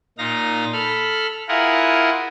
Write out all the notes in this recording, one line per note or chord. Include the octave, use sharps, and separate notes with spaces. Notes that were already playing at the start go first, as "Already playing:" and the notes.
A#2 D#4 F5 A#6
A4 B5 F6
E4 F4 G#4 A#4 F#5